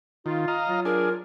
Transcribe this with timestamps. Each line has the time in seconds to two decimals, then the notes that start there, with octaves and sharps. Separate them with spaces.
0.26 D#3 F4
0.48 D#5 F5 A#5
0.68 F#3 F4
0.85 D4 G#4 A#4